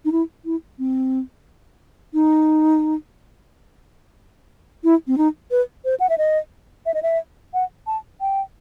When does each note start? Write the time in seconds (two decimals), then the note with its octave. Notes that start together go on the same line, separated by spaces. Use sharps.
0.05 D#4
0.12 E4
0.45 E4
0.79 C4
2.14 D#4
4.84 E4
5.07 C4
5.18 D#4
5.51 B4
5.85 C5
6.00 F#5
6.09 E5
6.18 D#5
6.86 E5
6.94 D#5
7.03 E5
7.54 F#5
7.87 A5
8.21 G5